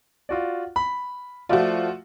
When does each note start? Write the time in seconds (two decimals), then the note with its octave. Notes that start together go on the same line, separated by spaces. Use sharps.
0.29 F4 F#4 D5
0.76 B5
1.49 F3 A3 F4 F#4 D5